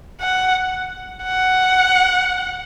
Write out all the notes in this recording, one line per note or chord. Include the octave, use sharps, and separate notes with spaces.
F#5
F#5